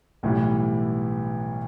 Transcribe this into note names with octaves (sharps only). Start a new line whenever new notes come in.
B1 A2 E3 G3